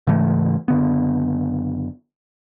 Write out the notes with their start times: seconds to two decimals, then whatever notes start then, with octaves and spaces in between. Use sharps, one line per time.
0.07 G#2 C#3 E3 A3
0.68 F#1 D3 B3